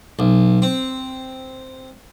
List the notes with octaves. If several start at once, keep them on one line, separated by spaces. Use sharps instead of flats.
B1
C4